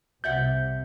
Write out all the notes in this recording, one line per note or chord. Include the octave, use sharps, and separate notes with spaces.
C2 C3 D5 E5 F#5 G6